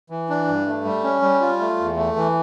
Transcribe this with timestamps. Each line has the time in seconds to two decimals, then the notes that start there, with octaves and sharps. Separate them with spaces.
0.10 E3
0.30 D4
0.47 G2
0.67 A3
0.85 G3
1.04 C#4
1.22 G3
1.41 F4
1.60 A3
1.79 E2
1.97 A3
2.16 E3